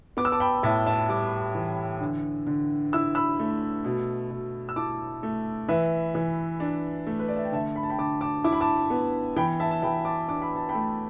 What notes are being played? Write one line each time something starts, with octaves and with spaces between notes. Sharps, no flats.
B3 D6
E6
A5 D6
G5 B5
A2 E5 A5
E5 A5
G3 A5 D6
E3
D3
D3
E4 E6
B5 E6
A3
B2
B2
E6
E4 A5 D6
A3
E3 B4 E5
E3
D4
A3
B4
D5
E5
G5
D3 E5 A5
B5
A5
G5 B5
D3 A5 D6
A5 D6
E4 D6
B5
A5 D6
B3
E3 G5 B5
E5 A5
A5
E3 G5 B5
A5 D6
D4 D6
B5
A5
G5 B5
A3